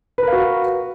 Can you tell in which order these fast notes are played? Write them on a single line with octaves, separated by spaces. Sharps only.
B4 A#4 F5 F#4